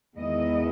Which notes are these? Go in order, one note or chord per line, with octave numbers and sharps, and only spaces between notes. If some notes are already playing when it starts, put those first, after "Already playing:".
E2 D#3 G#3 B3 E4 D#5